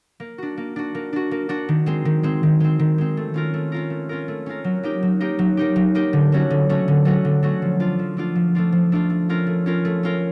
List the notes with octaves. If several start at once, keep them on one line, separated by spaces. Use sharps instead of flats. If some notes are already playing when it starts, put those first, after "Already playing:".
A#3
D4 F#4
A#3
D4 F#4
A#3
D4 F#4
A#3
D4 F#4
D#3
G#3 C4
D#3
G#3 C4
D#3
G#3 C4
D#3
G#3 C4
A3
C#4 F4 A#4
A3
C#4 F4 A#4
A3
C#4 F4 A#4
A3
C#4 F4 A#4
F#3
A#3 D#4 G4
F#3
A#3 D#4 G4
F#3
A#3 D#4 G4
F#3
A#3 D#4 G4
D3
F#3 A3 C#4 F#4
D3
F#3 A3 C#4 F#4
D3
F#3 A3 C#4 F#4
D3
F#3 A3 C#4 F#4
F3
A3 D4 F4
F3
A3 D4 F4
F3
A3 D4 F4
F3
A3 D4 F4
A3
C#4 F4 A#4
A3
C#4 F4 A#4
A3
C#4 F4 A#4